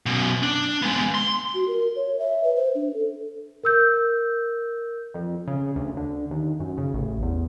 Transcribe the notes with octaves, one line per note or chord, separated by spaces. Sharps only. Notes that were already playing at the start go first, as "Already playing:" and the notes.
F#2 B2
D4
G#3 B3
C6
F#4
A#4
C#5
E5
B4
C5
D4
A4
A#4 E6 G6
F2
C#3
D2
D3
D#2
F#2
C#3
A1
E2